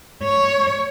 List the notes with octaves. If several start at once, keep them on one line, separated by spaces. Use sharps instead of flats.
C#5